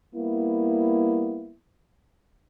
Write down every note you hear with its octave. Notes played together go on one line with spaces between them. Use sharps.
G3 A#3 B3 E4